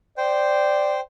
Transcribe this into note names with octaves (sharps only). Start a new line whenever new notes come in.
C5 D5 G5